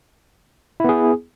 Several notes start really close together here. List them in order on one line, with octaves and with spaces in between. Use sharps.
E4 B3 G#4